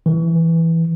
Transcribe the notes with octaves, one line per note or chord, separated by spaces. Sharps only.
E3